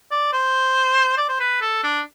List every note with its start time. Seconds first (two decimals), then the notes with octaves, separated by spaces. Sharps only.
0.11 D5
0.33 C5
1.17 D5
1.29 C5
1.40 B4
1.61 A4
1.83 D4